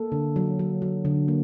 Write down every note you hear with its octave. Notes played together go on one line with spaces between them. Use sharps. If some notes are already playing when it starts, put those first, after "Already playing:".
Already playing: A#3 A4
D3
F#3
F#3
F#3
D3
A#3